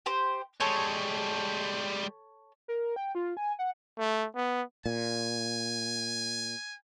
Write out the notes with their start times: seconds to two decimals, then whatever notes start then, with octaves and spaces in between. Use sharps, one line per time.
0.06 G4 C5
0.60 G3 G#3 A4 C#5
2.68 A#4
2.96 G5
3.15 F4
3.37 G#5
3.59 F#5
3.98 A3
4.35 B3
4.86 A#2 G#5